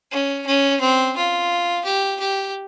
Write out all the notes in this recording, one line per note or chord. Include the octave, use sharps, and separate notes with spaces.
C#4
C#4
C4
F4
G4
G4